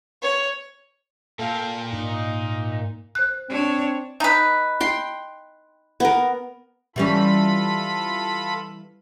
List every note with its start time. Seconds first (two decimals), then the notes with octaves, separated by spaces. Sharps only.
0.22 C#5
1.39 A#2 A#3 A4 F5 G5
1.93 G#2 D#4
3.15 C5 F#6
3.50 C4 D4 C#5
4.20 D#4 B4
4.80 G5 C6
6.00 B3 A#4
6.96 E3 G3 C#4 F4 A4 B5